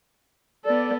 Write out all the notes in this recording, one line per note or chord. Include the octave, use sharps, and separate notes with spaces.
B3 A4 D5